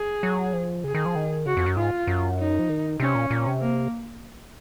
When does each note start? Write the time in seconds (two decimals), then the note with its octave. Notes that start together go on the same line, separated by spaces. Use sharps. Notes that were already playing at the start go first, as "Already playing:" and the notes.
Already playing: G#4
0.23 F#3
0.53 F3
0.84 C#3 G#4
0.95 D#3
1.06 F3
1.15 D#3
1.46 C#3 F#4
1.57 F2
1.66 F#2
1.77 G#2 F4
2.07 F#2
2.39 D#4
2.59 F3
2.69 D#3
3.00 C3 C#4
3.15 A#2
3.30 A#2
3.47 C3
3.61 A#3